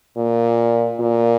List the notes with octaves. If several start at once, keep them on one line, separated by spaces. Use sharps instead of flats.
A#2
A#2